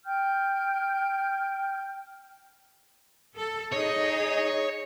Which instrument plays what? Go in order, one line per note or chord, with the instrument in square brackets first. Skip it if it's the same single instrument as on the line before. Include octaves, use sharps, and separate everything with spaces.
[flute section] G5 F6 G6
[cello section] A4
[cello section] D#4 G#4 D#5 [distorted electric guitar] C#5